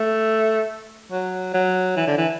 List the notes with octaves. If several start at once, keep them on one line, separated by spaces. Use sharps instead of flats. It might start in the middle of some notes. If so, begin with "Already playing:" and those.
Already playing: A3
F#3
F#3
E3
D3
E3